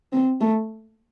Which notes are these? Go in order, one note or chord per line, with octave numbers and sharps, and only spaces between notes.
C4
A3